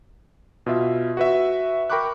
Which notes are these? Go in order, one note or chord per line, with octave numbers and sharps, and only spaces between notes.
B2 F4 E5
F#4 B4 E5
A#4 G5 B5 C#6 D6 F#6